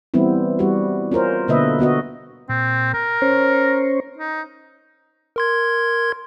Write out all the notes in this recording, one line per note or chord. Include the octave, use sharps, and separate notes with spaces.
E3 G3 B3 C4 E4
G3 F#4
C#4 F4 A#4 C5
B2 D3 A#3 B4 D#5 E5
D3 B3 F#4 D#5
A#2 C4
A#4
C#4 C5 C#5
D#4
A#4 C6 G#6